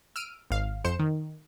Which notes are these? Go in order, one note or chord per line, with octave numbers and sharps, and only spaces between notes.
E6 F6 D7 D#7
G#1 F5
F2 C5 C#7 E7
D#3